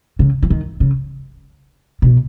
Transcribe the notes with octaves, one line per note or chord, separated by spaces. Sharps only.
C#3
E3
D#3
C#3
B2